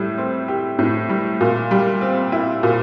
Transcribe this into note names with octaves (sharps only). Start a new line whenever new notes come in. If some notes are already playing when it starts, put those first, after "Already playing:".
Already playing: A2 G3
C4
G4
A2
G3
A#2
G3
C4
E4
A#2